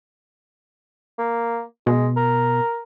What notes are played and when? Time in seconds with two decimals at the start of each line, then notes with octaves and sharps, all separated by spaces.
1.19 A#3
1.87 B2 G#3
2.17 A#4